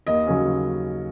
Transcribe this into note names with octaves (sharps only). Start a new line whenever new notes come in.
D#2 D#5
C#3 F#3 C#4